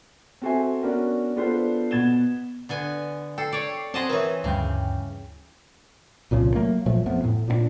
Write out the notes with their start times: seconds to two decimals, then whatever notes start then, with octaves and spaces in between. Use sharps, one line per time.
0.42 C4 F#4 A4 C5 E5 G#5
0.83 B3 C#4 D4 F#4 A#4
1.36 B3 D4 F4 A4 B4 C5
1.91 B2 B3 G#6 A6 E7 G7
2.69 D3 B3 G#5
3.38 A4 G5 C7
3.53 C#5 D5
3.94 C4 G#4 D#5 F#5 A5 C6
4.09 E3 C4 A#4 B4 C#5
4.44 D2 G2 C#3 G5
6.31 C2 A#2 C#3 F3
6.55 F#3 A3 A#3
6.86 A#2 F3 F#3 A3
7.06 F2 F3 A3 B3
7.24 A2
7.48 A#2 C4 D4